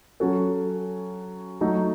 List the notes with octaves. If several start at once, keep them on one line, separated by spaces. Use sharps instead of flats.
F#3 C#4 F#4 A4
F#3 A3 D#4